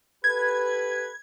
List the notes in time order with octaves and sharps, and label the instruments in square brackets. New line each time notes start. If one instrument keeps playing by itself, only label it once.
[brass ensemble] G4 A4 B4 [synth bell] G#6